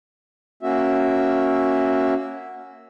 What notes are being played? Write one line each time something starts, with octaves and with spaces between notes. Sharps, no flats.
A#3 C#4 F#4 E5